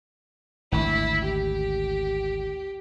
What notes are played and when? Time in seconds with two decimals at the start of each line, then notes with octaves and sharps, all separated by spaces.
0.72 G#1 D2 E4
1.24 G4